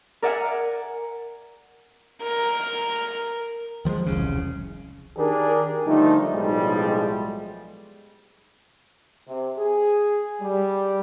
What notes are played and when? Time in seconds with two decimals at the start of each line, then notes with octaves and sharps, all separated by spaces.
0.22 A#4 D5 E5 F#5 G#5 F6
2.23 A#4
3.85 D#3 F3 G3 G#3
4.07 E1 C2 C#3
5.17 D#3 D4 G4 G#4 A#4
5.86 D3 F3 G3 A3 D4 D#4
6.31 B1 A2 F3 G3 G#3
9.28 C3
9.58 G#4
10.42 G3